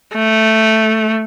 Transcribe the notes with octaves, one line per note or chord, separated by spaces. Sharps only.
A3